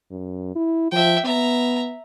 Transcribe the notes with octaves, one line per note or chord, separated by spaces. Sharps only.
F#2
E4
F3 E5 G5
B3 E5 A#5